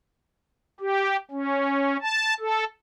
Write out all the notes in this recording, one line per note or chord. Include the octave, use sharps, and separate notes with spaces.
G4
C#4
A5
A4